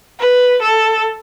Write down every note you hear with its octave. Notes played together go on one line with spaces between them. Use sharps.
B4
A4